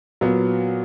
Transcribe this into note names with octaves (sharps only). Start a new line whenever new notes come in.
A#2 F#3 B3